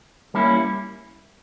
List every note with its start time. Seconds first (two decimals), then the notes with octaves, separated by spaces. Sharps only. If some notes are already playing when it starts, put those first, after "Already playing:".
0.34 G3 A#3 C#4 E4